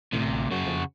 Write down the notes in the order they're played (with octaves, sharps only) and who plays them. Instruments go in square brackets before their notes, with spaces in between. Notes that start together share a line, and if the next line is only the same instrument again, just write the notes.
[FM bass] A1 [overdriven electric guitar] D2 C3
[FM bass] F#2 [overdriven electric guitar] C#3 F#4
[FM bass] F2